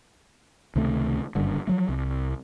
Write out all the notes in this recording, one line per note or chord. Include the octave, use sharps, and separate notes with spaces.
C#2 C3 D#3 A3
F#1 G2 D3
F3 F#3 A3
C2